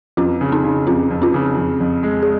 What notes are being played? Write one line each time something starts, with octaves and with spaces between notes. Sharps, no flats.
F2 C#4 F4
C#3
C4 D#4
C#3
F2 C#4 F4
F2
C#4 F4
C#3
F2
F2
G#3
G#4